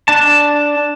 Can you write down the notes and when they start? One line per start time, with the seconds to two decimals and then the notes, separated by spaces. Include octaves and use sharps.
0.08 D4 A5